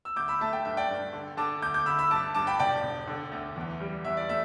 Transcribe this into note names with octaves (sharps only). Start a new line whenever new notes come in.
E6
D2 D6 G6
B5 E6
A3 E5 A5
G5
G2 E5
D5 G5
G2
D3
D3 A5 D6
D2 D6 G6
D6 G6
D2 B5 E6
B5 E6
G2 A5 D6
G2 A5 D6
G5 B5
E1 D5 G5
E1
D3
D2
E2
G3
E2 E5
D5
A3 E5